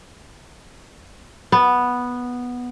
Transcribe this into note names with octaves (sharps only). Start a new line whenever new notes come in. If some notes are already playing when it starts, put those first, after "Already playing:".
B3